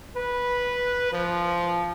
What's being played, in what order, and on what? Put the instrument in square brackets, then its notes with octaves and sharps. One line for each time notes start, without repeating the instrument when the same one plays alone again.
[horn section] B4
F3